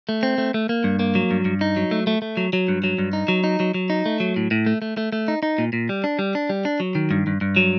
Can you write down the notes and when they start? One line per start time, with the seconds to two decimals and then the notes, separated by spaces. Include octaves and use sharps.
0.09 A3
0.23 C4
0.38 A3
0.54 A3
0.69 A#3
0.84 G2
0.99 A#3
1.15 F#3
1.31 G2
1.45 G2
1.61 D#4
1.76 F#3
1.91 A3
2.07 A3
2.22 A3
2.37 F#3
2.53 F#3
2.68 G2
2.84 F#3
2.98 G2
3.13 D#4
3.28 F#3
3.44 D#4
3.60 F#3
3.74 F#3
3.90 D#4
4.06 A3
4.20 F#3
4.36 A2
4.51 A2
4.66 A3
4.82 A3
4.97 A3
5.12 A3
5.28 D#4
5.43 D#4
5.58 A#2
5.73 A#2
5.89 G3
6.04 D4
6.19 G3
6.35 D4
6.50 G3
6.65 D4
6.80 F#3
6.95 D#3
7.11 G2
7.27 G2
7.41 G2
7.56 F#3